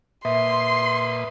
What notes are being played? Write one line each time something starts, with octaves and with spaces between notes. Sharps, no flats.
A#2 B4 E5 C6 D#6